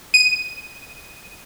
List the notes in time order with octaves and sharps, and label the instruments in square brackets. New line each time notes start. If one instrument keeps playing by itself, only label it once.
[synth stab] D#7